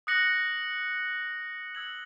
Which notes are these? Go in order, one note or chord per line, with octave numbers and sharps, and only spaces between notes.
D#6 F#6 A#6 C#7 F#7
E6 G#6 C#7 F#7